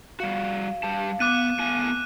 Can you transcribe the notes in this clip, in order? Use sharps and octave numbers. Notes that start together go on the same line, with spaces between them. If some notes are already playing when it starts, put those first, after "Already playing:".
G3 F#4 F5
G3 G4 A5
B3 D6 F#6 D#7
A3 B3 G#5